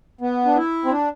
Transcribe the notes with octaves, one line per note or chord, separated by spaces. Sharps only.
B3
D4
E4
C4
D4